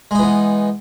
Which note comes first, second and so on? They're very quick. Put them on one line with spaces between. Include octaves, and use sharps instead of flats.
G#3 D#4 E3 B3